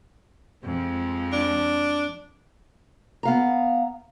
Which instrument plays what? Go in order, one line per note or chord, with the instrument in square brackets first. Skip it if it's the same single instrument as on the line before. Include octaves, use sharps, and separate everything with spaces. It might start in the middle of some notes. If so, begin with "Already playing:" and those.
[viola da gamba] F2 F3 G#3
[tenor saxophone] D4
[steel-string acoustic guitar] B3 F5 A#5